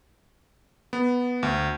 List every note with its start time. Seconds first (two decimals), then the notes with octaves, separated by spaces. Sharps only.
0.93 B3
1.43 D2